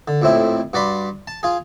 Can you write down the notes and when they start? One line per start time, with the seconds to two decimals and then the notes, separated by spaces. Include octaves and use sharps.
0.08 D3
0.22 A#1 F2 A2 C4 E4
0.73 G2 F#4 D5 B5 C6
1.27 A5
1.43 F4 G#4